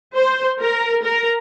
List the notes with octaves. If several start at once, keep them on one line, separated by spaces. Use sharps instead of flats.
C5
A#4
A#4